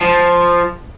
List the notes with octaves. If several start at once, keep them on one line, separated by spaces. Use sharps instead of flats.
F3